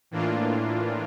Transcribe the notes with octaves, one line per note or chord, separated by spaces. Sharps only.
A2 E3 A#3 D4 F4